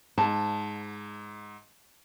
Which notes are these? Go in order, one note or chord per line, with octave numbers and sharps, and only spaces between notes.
G#2 A5